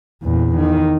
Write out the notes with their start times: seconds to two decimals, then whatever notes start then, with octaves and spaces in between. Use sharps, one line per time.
0.23 E2 A#2
0.56 D#3